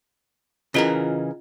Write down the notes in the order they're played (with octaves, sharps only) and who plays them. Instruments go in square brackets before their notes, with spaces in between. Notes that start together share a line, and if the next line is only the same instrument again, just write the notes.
[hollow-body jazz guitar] C#3 E3 A#4 [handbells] C#4 F4 D#5